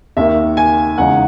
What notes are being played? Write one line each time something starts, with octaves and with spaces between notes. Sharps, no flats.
D#2 D#3 A#3 E5
G#5
E2 C#3 G#3 D#4 F#5